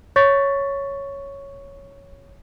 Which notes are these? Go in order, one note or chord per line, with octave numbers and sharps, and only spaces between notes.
C#5 C#6 A6 B6